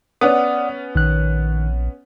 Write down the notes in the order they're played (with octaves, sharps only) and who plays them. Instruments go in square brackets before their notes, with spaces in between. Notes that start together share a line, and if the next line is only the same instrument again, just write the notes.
[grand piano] B3 C#4 [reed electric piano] D5 F#5 D#6
[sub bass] A#1 [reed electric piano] D#3 F#6